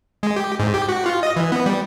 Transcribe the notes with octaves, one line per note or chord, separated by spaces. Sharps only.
G#3
G4
G#2
G4
F#4
F4
D#5
E3
B3
G3